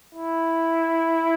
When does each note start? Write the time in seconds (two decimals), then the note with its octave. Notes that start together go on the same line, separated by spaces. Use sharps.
0.15 E4